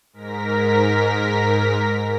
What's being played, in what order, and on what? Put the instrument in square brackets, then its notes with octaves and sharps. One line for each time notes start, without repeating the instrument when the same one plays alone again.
[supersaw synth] G#2 A#4 A#6 B6